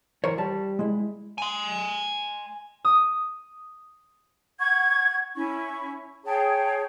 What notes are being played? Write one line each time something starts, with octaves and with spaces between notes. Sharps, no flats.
E3 A#4 C5 C#5
G3 A5
G#3 E4
G#5 C6
D#6
F#5 C#6 G#6
C#4 E4 C#6
G#4 C#5 G5 A5